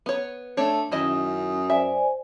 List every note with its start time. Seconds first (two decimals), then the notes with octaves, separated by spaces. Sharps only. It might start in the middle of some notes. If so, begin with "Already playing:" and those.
0.06 B3 C#5
0.57 A3 D4 C#5
0.92 F#2 D#3 C#4 E4 D#5 D#6
1.70 C5 D5 E5 G#5